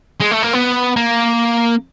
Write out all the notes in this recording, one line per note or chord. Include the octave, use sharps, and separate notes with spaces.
G#3
A3
A#3
B3
A#3